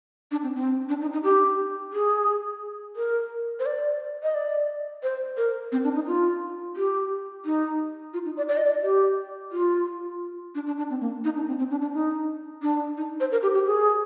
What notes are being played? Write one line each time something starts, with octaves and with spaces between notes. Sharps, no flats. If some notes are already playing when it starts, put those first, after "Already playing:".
D4
C4
C4
D4
D#4
D#4
G4
G#4
A#4
C5
D5
D#5
D5
C5
A#4
C4
D4
D#4
F4
G4
D#4
F4
D#4
D5
D5
D#5
D5
G4
F4
D4
D4
D4
C4
A#3
D#4
D4
C4
C4
D4
D4
D#4
D4
D#4
C5
A#4
G4
G4
G#4